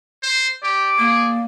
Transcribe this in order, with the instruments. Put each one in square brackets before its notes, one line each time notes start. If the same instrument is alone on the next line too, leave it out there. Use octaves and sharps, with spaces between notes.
[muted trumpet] C5
[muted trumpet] G4 [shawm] D5
[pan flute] A#3 [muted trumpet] G#4